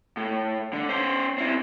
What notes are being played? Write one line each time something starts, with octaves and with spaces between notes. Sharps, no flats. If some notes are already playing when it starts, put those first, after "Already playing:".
A2
D3
C#4 C5
C4 E4